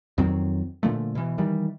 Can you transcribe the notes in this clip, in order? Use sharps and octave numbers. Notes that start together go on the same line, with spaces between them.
F2 D#3 F#3 C4
A#2 D3 F3 A3
B2 E3
D#3 E3 G3